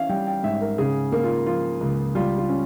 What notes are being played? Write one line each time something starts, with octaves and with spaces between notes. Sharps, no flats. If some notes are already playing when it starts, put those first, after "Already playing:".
Already playing: E3 C#4 E5 F5
G3 G5
G5
G#2 E5
A#4
C#3 G#4
A#3
F4
F3 F4
C#2
G3 F4
F4
C#4